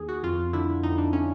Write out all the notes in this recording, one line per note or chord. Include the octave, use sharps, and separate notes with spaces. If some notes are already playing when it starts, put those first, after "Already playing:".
Already playing: D#2 G#4
F#4
F2 F4
D3 E4
F2 D#4
D4
D3 C#4